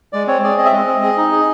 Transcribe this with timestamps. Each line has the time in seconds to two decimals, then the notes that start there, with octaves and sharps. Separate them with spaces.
0.13 G#3 D5
0.27 C4 C#5
0.43 G#4 D5
0.58 C4 D#5
0.65 E5
0.72 G#3 D#5
0.87 C4
1.03 G#4
1.18 D#4
1.32 G#4